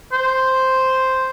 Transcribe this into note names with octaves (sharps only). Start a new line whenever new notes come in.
C5